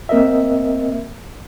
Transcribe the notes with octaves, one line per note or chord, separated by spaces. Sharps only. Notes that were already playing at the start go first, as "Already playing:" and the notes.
A#3 C4 A#4 D#5 E5